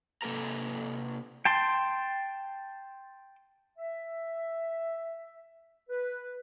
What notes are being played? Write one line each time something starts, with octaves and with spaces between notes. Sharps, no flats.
C3 E3 A#3 A4 B4 A#5
G5 A5 C6
E5
B4